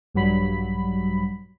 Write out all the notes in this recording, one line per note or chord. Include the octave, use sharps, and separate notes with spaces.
A#1 G2 F#3 B5 B6